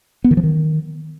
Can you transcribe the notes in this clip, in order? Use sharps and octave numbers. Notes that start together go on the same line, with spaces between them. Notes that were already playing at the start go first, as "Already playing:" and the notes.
B3
D#3
F3
D#3